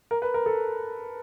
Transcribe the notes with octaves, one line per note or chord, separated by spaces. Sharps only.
A#4
B4
A#4
A4